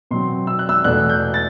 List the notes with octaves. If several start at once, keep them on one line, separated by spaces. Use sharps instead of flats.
B2 F#3 C4 C6
E6
F#6
E6
E2 B2 A3 F#6
G6
A6